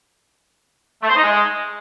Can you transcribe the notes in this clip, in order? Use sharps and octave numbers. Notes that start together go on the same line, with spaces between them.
A3
C5
D#4
G#3